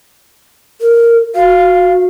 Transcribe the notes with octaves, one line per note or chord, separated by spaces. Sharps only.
A#4
F#4 F5